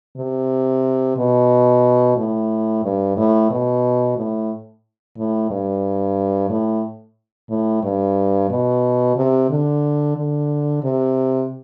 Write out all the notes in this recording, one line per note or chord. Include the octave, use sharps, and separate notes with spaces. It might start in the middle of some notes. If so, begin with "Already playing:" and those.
C3
B2
A2
G2
A2
B2
A2
A2
G2
A2
A2
G2
B2
C3
D3
D3
C3